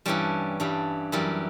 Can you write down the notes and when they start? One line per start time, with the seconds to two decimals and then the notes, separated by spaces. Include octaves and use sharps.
0.06 G2 E3 G3 C#4
0.60 G2 E3 G3
1.12 F#2 E3 G3